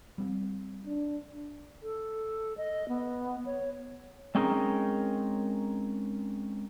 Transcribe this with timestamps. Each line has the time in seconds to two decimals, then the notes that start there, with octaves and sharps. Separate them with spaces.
0.18 G3 C4
0.86 D4
1.83 A4
2.58 D#5
2.89 B3
3.46 C#5
4.35 G#3 C4 C#4 D#4 G#4 A#4